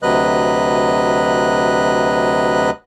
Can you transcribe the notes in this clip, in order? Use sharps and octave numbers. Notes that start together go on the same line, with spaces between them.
D2 C3 F#3 B4 D#5 F#6